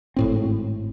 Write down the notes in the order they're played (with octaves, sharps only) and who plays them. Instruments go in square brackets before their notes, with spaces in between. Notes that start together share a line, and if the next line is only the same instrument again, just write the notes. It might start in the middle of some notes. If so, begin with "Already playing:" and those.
[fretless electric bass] G#1 A2 C4